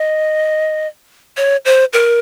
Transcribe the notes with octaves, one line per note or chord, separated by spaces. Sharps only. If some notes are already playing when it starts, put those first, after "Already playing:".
Already playing: D#5
C#5
C5
A#4